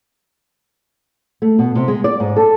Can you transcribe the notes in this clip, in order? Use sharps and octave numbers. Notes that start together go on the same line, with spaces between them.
A3
B2
C3
G#3
D5
G#2
A4